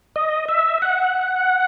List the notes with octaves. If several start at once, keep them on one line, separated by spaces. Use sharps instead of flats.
D#5
E5
F#5